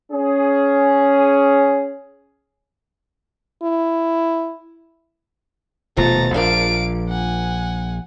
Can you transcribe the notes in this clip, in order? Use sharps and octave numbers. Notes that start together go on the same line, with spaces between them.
C#4 G#4
E4
D#1 B2 F3 A3 A#5 A6
A#1 D4 A#4 D5 F5 D7
F#5 G#5